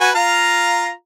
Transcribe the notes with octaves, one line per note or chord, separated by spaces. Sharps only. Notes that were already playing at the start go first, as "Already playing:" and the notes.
F#4 B4 G#5
F4 F5 A#5